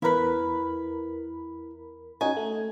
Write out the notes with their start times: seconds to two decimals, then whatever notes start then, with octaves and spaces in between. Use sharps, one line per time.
0.02 E2 E4 A#4 B4 B5
2.21 C#4 D#4 F#4 G#5
2.37 A3